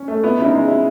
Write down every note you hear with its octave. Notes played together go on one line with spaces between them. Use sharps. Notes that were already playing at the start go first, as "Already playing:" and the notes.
Already playing: C#4
A3
B3 E4
C#3 E4
D#4
G#3
E4